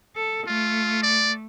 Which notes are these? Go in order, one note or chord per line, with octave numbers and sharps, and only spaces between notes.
A4
A3 F4
D5